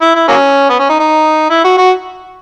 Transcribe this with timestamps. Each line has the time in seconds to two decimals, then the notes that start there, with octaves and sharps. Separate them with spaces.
0.02 E4
0.15 E4
0.28 F#3 A#3 C#4
0.70 B3
0.80 C#4
0.89 D#4
1.00 D#4
1.51 E4
1.64 F#4
1.78 F#4